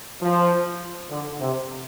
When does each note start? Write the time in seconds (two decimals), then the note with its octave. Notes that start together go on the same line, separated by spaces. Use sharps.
0.21 F3
1.10 D3
1.41 C3